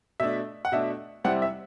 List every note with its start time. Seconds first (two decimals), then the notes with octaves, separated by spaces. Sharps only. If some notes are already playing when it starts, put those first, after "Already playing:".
0.20 B2 A3 D4 E5
0.65 F#5
0.72 B2 A3 D4 E5
1.24 C3 G3 C4 E4 F#5
1.42 E5